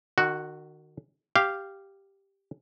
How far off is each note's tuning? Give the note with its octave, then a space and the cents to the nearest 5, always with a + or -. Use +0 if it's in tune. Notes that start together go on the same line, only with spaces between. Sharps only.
D#3 -35 F#4 +0
G4 +0 F5 -10